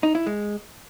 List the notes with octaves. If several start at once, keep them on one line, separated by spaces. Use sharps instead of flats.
D#4
E4
G#3